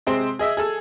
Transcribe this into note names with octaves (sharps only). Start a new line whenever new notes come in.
C3 G#3 C4 C5
G#4 D#5 E5
G#4 A4 E6